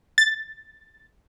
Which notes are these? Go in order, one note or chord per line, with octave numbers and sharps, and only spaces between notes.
A6